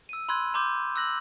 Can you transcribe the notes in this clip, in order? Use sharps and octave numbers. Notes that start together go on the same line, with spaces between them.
E6 D#7
B5 C6 E6 F#6 G#6
A#5 C6 D6 G6 E7
E6 F#6 A#6 F#7